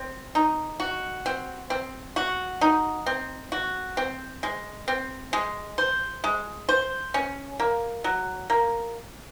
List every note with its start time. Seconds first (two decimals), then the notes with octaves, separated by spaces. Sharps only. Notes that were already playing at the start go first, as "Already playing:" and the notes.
Already playing: C4
0.35 D#4
0.80 F#4
1.26 C4
1.70 C4
2.16 F#4
2.61 D#4
3.06 C4
3.52 F#4
3.97 C4
4.43 G#3
4.88 C4
5.33 G#3
5.78 C5
6.24 G#3
6.69 C5
7.14 C#4
7.60 A#3
8.04 F#3
8.50 A#3